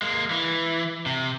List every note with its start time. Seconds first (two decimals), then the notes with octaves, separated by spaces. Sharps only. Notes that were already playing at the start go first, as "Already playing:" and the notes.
0.02 G#3 A#3
0.30 E3
1.06 C3